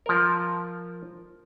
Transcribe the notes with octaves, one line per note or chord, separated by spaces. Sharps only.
F3 A#4